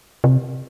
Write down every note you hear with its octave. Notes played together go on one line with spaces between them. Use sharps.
C3